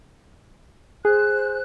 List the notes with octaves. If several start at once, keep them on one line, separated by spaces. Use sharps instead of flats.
G#4 C5 F#6